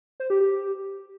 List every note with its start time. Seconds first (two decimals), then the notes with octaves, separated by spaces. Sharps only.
0.20 C5
0.30 G4
0.40 G4